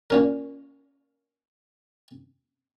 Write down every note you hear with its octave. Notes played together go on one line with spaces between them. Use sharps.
A#2 C#4 A#4